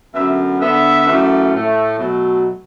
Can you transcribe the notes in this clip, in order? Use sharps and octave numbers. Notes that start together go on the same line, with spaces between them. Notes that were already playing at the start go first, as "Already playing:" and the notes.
F#2 D3 B3 E5
D3 B3 E5
F#2 E3 A3
A2 A3
B2 F#3 A3